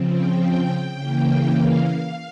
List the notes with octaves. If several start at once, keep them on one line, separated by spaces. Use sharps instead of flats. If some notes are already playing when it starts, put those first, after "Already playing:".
Already playing: C#3 F3 C4
G5
G5
C#3 E3 A#3
F5